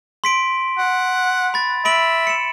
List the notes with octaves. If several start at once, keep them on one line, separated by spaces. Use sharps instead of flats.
C6 B6 D7
F#5
B5 A6
E5 B5 D7 F#7
C#7 E7